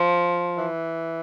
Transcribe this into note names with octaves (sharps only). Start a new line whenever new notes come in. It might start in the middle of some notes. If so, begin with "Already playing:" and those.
Already playing: F3
E3